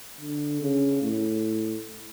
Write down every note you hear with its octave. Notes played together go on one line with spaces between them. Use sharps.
D3
C#3
A2